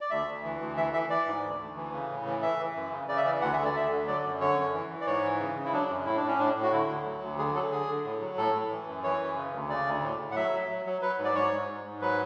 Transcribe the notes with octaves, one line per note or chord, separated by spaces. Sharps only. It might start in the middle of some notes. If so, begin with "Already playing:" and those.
D5
D2 E5
D2
E3
D2
E3 E5
E3 E5
E3 D5
G#2
D2
D2
E3
C#3
A2
E3
E3 E5
E3
F#2
C#3
C#3 D5
E5
E3 D5
D2 F#5
D3 E5
D5
D2 E5
D3
F#3 D5
F#2
D3 C#5
F#2
E3
E3
D5
G#2 C#5
E3
C#3
C#3
E4
F#3 D4
F#2
A2 E4
D4
A2
C#4
A2 D4
A2
F#4
D3 E4
D2
F#3
D2
D3 G#4
F#3 A4
D3 G#4
D3
A2
F#3
A2 A4
A2
E3
F#2
E3 C#5
F#2
C#3
D2
C#3 D5
D2
A2
A2
F#5
F#3 E5
F#3
F#3
F#3
F#3 B4
G#2
D5
G#2 C#5
G#2
G#2
G#2
F#3 B4